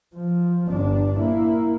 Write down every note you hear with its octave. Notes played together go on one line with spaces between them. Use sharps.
F3
G1 D4
A#3 E4